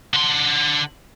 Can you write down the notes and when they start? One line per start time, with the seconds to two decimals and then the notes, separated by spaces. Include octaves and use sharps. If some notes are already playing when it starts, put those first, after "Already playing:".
0.14 D3 C6